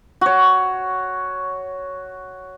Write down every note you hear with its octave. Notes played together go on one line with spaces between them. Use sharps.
F#4 C#5